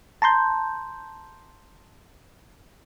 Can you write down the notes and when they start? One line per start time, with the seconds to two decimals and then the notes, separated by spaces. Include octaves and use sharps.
0.22 A5 A#5 C6 G6